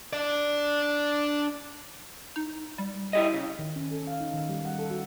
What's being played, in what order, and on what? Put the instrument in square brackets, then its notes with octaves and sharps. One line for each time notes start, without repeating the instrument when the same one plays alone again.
[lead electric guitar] D4 D5
[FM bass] D#4
G3
[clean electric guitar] E4 G4 D#5
C#3
[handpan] D#3
C#4
A4
F5
D#4
D#3
G3
F#5
A4
F#4